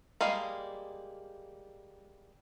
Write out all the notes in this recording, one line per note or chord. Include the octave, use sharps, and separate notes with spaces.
G3 G#3 A#3 F5